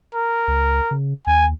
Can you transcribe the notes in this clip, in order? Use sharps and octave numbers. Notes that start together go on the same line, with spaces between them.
A#4
C#2
C#3
D#2 G#5